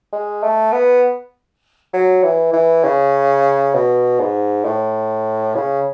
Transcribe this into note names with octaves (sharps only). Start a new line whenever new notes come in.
G#3
A3
B3
F#3
E3
E3
C#3
B2
G#2
A2
C#3